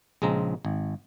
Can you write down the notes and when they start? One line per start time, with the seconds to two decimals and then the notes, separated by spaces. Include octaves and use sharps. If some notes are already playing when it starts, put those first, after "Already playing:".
0.22 A#1 C#3 G#3 C4 A#5
0.65 G#1